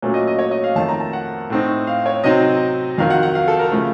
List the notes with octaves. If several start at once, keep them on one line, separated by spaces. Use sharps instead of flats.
A#2 F#3 A3 C#4
D#5
D#5
C#5
D#5
F5
F2 D#3 A3 A5
A#5
A5
F#5
A2 A3 C4 D#4
F5
C#5
C3 F#3 C4 D#4 D#5
F2 D#3 F#3 F5
F#5
F#5
F5
A4
A#4
C#3 F3 A3